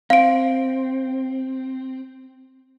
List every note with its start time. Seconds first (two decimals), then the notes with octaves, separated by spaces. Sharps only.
0.10 C4 F5 D7